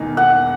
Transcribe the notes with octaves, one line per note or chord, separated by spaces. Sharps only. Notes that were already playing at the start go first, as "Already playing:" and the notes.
Already playing: E1 E2 D#3 A#3 D#4
F#5